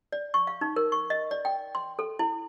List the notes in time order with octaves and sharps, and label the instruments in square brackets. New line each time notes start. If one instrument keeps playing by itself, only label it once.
[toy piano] D5
C#6
F5
D#4
A#4
C#6
D#5
D5
G5
C6
A4
E4